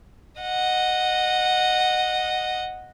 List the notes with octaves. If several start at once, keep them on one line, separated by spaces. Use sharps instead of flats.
D#5 F#5